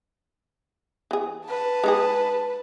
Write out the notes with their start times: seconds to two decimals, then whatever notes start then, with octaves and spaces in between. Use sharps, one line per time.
1.11 E3 G#4
1.46 B4 A5
1.84 G#3 D#4 G#4